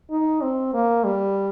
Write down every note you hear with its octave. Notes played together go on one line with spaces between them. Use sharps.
D#4
C4
A#3
G3